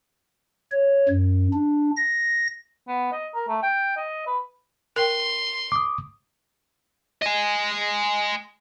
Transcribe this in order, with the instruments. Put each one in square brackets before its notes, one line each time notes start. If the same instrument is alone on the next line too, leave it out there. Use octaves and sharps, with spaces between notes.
[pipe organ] C#5
F#2
D4
A#6
[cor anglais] B3
D#5
A#4
A3
G5
D#5
B4
[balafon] A#4 G5 [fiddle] C6
[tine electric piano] D6 D#6
[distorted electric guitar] D#5 G#5